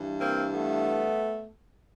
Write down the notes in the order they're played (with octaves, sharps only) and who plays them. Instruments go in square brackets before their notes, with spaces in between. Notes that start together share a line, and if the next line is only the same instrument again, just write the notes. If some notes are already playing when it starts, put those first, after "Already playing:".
Already playing: [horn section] G2 E3
A#3 C4
A3 B3